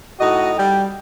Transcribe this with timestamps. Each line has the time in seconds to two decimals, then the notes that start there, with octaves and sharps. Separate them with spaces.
0.20 A2 D#4 F#4 D#5
0.58 G3 G5